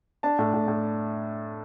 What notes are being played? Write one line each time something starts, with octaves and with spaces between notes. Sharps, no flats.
D4 A5
A2
A2
A2